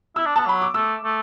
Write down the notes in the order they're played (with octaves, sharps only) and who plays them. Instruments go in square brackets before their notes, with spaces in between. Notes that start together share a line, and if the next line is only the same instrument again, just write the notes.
[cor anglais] E4 [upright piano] E6
[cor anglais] D4
[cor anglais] B3 [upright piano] A5
[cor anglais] F#3 [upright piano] B5
[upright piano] D6
[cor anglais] A3 [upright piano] E6
[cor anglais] A3